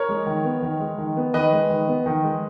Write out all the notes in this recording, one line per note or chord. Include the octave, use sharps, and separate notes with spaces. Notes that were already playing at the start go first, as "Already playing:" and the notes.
Already playing: A#4 C#5
G#3
D#3
B3
D#3
G#3
D#3
B3
D#3 B4 D#5
G#3
D#3
B3
D#3
G#3